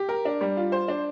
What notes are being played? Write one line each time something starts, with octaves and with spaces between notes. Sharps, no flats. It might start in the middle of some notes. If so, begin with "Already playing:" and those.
Already playing: G4
A#4
D4
G3
F4
C5
D4